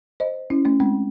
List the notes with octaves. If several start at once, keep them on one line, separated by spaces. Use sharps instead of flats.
C5 D#5
C#4 E4
A3 C#4
G#3 C4